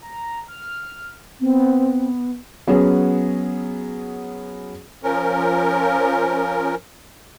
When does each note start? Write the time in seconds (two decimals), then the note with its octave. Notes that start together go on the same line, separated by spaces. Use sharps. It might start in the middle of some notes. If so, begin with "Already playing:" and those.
0.02 A#5
0.48 F6
1.41 B3 C4
2.67 F#3 B3 C#4 G#4
5.03 F3 C#4 A#4